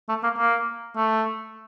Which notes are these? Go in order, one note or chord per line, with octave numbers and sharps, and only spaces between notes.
A3
A#3
A#3
A3